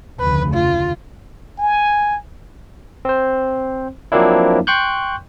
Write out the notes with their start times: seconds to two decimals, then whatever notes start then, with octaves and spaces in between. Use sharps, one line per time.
0.20 F1 D2 C#3 B4
0.54 F4
1.58 G#5
3.05 C4 C5
4.12 F3 F#3 A#3 C4 D4 E4
4.67 G5 C6 C#6 F#6 G6